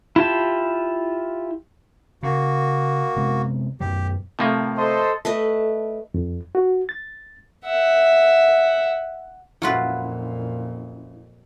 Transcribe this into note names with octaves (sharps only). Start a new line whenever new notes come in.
E4 F4 G4 A5
C#3 A#3 F#4
C3 G#3 B3
F#2 B2 F#3 G4
A2 C3 F3 A3 A#3 F5
A4 C5 D#5 C6
A3 A4 B4 D#5
F2
F#4
A6
E5 F#5
F2 A#2 F#3 C#4 E4 F4 B4